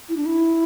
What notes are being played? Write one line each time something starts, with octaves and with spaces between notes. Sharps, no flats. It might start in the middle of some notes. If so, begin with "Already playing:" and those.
E4
D4
E4